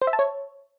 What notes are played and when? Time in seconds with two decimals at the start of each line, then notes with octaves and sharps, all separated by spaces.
0.02 C5
0.07 E5
0.13 A5
0.19 C#5